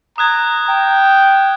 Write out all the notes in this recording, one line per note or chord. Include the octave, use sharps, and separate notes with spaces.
A#5 D#6 F#6 G#6
G5